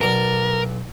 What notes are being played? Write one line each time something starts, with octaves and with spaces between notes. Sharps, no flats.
B1 A#4 D5